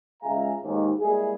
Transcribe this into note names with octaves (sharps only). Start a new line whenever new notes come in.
C#2 G#3 E5 F5 G#5 A#5
D#2 G#2
G3 G#3 A#3 E4 G#4